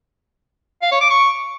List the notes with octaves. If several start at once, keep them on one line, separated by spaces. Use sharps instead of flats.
F5
C#5
D6
C#6